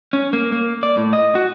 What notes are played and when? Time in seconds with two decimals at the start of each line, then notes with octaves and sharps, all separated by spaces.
0.13 C#4
0.33 A#3
0.52 A#3
0.83 D5
0.97 A2
1.13 D#5
1.35 F#4